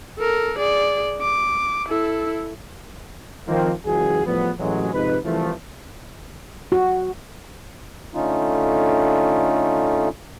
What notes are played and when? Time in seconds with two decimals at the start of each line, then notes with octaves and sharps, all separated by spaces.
0.19 A4 A#4
0.59 G#4 D5
1.21 D6
1.88 E4 A4
3.47 D#3 F3 A#3 C4
3.85 C#2 F#2 E3 F#4 G#4
4.25 E2 A2 F3 G3 B3
4.59 A1 F#3 G#3
4.93 F2 G#2 C3 D#4 B4
5.25 C2 E3 F3 A3
6.72 F#4
8.14 D3 A3 C#4 D#4 F4